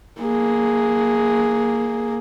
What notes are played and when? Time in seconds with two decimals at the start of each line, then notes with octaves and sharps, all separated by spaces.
0.20 A#3 G#4